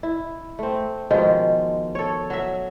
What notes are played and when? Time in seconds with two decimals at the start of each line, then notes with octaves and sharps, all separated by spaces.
0.03 E4
0.59 A3 C4
1.11 B2 D#3 F3 G#3
1.95 A4 C#5
2.30 F#3 E5